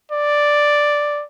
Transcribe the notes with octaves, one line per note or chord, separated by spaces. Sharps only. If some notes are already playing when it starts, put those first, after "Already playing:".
D5